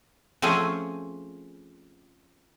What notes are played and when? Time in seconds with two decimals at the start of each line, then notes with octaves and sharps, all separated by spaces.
0.42 F3 A3 C4 C#4 G#4